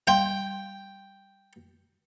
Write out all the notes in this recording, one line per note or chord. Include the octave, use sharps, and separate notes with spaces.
G3 F5 G5 C6